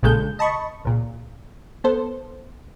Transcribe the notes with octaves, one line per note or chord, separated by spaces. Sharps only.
A#1 A#2 C#3 G#3 A4 G6
D#5 A5 B5 C#6
C#2 A#2
B3 A4 C5